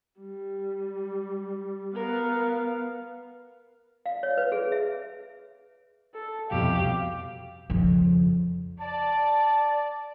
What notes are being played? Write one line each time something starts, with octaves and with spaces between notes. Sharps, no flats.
G3
B3 A#4 F5
F5
C#5
B4
G#4
E5
A4
C2 F2 B2 G4 F5
F2 C#3
D5 A5